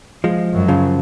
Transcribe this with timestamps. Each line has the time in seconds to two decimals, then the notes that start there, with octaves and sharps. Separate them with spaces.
0.24 F3 G#3
0.54 F#2
0.68 C#3 F3